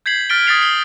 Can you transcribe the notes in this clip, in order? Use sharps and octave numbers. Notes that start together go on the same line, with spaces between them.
G6 G#6 B6 C7 F#7
F6 A6 B6 D7 G7
D#6 G#6 A6 B6 C7 F7
C7 G7